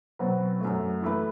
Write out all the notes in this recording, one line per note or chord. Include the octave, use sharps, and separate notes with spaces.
B2 F#3 C4 F#4 B4
F#2 F#3 A3
E3 A3 E4 B4